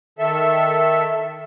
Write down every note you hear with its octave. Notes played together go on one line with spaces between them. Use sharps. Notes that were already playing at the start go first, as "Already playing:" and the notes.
D#3 A4 E5